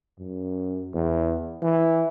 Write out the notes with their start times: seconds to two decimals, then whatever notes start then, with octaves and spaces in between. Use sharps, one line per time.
0.19 F#2
0.94 E2
1.62 E3